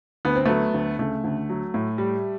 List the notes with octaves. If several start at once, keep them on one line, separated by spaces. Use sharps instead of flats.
D2 B3
C4
F#3 A3 B3
D2
C#3 A3
D2
F#3
A2
G3